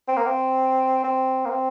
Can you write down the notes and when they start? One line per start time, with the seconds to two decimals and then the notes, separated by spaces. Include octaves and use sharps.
0.08 C4
0.16 A#3
0.26 C4
1.04 C4
1.45 A#3
1.50 C4